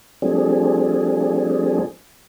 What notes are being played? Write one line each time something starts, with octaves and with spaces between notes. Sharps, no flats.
F3 G3 A3 C4 D4 G#4